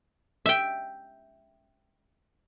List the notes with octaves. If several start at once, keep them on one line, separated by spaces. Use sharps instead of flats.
E5 G5